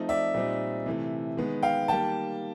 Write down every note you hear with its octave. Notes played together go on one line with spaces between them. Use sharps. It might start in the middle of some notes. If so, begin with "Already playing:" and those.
Already playing: F3 A3 C4 D#4
D5 E5
A#2 G3 C4 D#4
C3 E3 A3
D#3 G#3 B3
F5 G5
D#3 G3 A#3 G5 A5